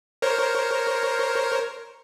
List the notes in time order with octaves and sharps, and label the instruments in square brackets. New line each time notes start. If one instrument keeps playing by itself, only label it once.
[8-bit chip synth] A#4 C5 C#5